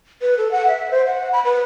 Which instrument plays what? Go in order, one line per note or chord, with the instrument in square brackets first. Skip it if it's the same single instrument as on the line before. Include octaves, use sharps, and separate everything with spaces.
[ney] B4
A4
F#5
E5
C5
F#5
B5
B4